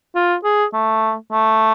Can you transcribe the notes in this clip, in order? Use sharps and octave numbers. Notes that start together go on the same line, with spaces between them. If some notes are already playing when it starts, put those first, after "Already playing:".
F4
G#4
A3
A3